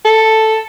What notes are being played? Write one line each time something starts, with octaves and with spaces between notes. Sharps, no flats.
A4